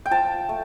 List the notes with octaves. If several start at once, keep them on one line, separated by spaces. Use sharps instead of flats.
G5
F3 A5
A3